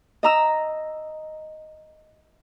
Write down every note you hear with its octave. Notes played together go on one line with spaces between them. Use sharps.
D#5 A#5 E6